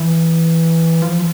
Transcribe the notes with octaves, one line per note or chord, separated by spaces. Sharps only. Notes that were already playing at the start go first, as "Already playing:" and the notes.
Already playing: E3
F3